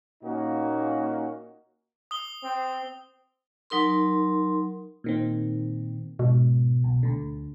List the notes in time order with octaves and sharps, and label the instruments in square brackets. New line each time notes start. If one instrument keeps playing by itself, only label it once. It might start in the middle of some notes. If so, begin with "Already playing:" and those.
[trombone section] A#2 A#3 C#4 D#4 F#4
[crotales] D#6 G7
[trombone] C4
[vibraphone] F#3 D#4 A#4 C6
[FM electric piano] A#2 D#3 C4
[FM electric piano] G#2 [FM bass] B2
[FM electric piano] C2
D2 D3